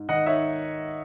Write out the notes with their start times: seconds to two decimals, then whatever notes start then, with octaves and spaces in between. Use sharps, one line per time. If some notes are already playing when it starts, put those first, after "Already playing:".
Already playing: G#2
0.09 D#3 D#5 F#5
0.26 D#4 C#5 E5